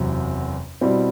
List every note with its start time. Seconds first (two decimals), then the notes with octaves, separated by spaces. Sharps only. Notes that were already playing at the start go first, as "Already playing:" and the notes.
Already playing: F#1 E2 C3 F#3 C4
0.81 B2 G3 C4 E4